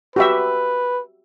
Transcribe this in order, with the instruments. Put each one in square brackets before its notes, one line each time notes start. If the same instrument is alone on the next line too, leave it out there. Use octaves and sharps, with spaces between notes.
[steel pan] F#4 G4 E5 [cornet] B4